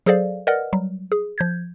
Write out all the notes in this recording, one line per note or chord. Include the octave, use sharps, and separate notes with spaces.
F#3 G#4 A4 C5 D5 F5
A#4 B4 D5 D#5 F#5 F6
F#3 G3
G#4
F3 G6 G#6